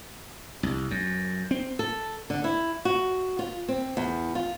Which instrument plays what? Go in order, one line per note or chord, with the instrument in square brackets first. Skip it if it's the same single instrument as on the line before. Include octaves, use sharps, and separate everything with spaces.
[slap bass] C2
F#2
C4
[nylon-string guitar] A4
D3
E4
F#4
F4
C4
E2
F4